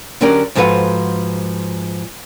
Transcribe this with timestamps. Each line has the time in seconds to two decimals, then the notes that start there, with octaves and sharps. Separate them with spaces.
0.21 D3 F#3 C#4 D4 G4 A#4
0.55 G#2 F3 F#4 A4 B4 F#5